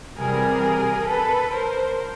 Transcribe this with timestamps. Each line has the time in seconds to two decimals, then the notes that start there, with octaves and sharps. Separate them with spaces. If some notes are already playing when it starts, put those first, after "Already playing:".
0.18 C3 E3 G3 G#4 A#4
1.09 A4 B4
1.54 A#4 C5